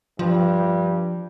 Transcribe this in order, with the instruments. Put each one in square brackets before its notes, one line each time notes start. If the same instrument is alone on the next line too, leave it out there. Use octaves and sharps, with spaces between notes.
[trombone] G2 [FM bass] F3